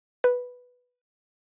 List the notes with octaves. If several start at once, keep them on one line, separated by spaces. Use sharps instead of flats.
B4